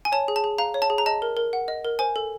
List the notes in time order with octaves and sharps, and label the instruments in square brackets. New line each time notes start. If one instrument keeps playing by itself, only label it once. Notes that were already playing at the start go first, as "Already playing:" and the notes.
[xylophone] G#5
C#5 A5
G#4
A5
G#4
F5 A#5
C#5
A5
G#4
A#5
D#5 A5
A#4
A#4
F#5
D#5
A#4
C5 G#5
A4